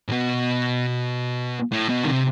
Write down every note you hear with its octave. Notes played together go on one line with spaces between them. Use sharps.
A2
B2
A2
B2
D#3
C3